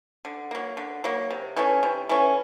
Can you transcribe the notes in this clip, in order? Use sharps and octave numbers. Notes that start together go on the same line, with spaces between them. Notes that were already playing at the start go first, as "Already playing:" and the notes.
D3
F#3 A#3
D3
F#3 A#3
C3
E3 A3 C#4
C3
E3 A3 C#4